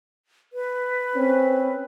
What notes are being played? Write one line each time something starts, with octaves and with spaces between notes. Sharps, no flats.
B4
C4 C#4